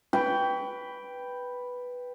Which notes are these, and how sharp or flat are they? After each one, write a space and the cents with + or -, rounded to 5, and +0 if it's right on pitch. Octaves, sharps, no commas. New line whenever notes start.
B4 +0 G5 +0 C#6 +40